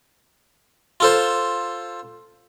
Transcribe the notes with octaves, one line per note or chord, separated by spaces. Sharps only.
F4 A4 C5